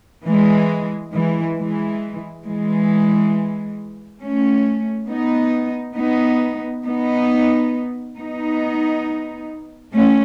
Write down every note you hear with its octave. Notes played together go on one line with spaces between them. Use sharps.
E3 G#3
E3 G#3
E3 G#3
E3 G#3
A3 C#4
B3 D#4
B3 D#4
B3 D#4
B3 D#4
A3 C#4